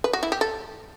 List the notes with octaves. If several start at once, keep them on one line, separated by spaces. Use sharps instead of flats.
B4
F#4
E4
G4
A4